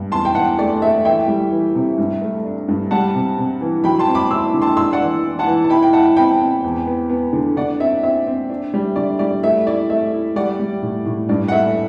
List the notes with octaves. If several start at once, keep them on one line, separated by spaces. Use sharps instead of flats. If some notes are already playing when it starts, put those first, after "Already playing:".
Already playing: G2
E2 A5 C6
G5
E2 F#5 A5
A3 D5
A3 E5
E3 E5 G5
G3
E3
C3
G2
A3
D4
G2
G3 F#5 A5
C3
C3
E3
F#3 G5 B5
A5 C6
C4
B5 D6
E4 C6 E6
D3
A5 C6
D4 C6 E6
D5 F#5
E3
E3
F#5 A5
E3
A5
E4 G5 B5
G5
E4 F#5 A5
C4 G5 B5
C4
E2
B3
B3
D3
D3 D5 F#5
C4 E5
C4 E5
C4
D4
G3
D3 D5
G3 D5
A3 E5
E4 D5
A3 E5
E4
G3 D5 F#5
G3
A2
A2
G2 D5
F#5
A3 E5